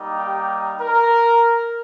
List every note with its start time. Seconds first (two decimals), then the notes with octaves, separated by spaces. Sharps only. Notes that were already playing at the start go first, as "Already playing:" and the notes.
Already playing: G3 A#3 D#4
0.16 G4
0.80 A#4